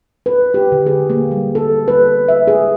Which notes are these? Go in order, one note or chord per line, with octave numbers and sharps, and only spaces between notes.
B4
G4
D3
G#4
A#3
G3
A4
B4
E5
G#4